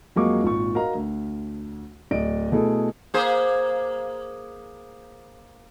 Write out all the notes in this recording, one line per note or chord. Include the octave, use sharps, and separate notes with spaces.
F2 F#3 G#3 A#3 C#6 D6
G#1 A#2 C#6
F#4 A#4 D#5 F5 A#5
D2
D1 D5 D#5 D7
B2 A3 E4 G#4 A4
A#3 G#4 C5